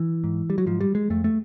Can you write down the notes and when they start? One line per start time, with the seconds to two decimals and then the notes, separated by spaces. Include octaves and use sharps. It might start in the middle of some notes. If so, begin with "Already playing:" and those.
Already playing: E3
0.24 G#2
0.50 G3
0.58 F#3
0.66 G#2 F3
0.81 G3
0.95 G#3
1.10 F2 A3
1.24 A3